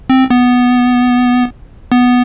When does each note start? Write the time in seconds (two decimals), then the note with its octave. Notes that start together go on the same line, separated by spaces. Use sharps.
0.10 C4
0.30 B3
1.92 B3